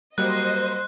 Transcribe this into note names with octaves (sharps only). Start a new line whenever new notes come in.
F#3 G3 A#3 C5 D#5 F#6